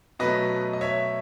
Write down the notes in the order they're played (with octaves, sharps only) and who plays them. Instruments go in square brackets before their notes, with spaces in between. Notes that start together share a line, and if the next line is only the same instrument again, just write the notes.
[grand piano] B2 F#3 A3 B4 D#5
D#5
C#5 E5